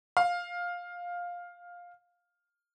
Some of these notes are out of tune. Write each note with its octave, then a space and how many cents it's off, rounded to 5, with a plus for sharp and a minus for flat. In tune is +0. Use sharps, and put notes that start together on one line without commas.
F5 +10